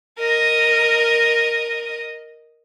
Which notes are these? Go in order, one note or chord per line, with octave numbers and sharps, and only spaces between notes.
A#4 D#5